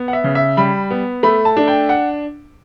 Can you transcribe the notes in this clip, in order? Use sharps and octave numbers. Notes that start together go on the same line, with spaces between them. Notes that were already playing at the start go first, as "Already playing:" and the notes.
Already playing: B3
F#5
E5
C#3
E5
G3 B5
B3
A3 B5
A5
D4
G5
F#5